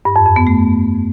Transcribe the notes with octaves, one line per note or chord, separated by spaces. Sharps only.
G2
F2
F2
B3
A3